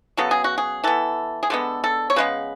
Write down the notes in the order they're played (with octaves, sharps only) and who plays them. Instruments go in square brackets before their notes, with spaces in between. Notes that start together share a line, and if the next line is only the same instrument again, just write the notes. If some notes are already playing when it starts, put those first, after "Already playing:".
[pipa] C#3 F#3 B3 A4
G#4
F#4
G#4
E3 B3 A4
G#4
D3 G#3 B3 A4
A4
C#5
C#3 G#3 B3 B4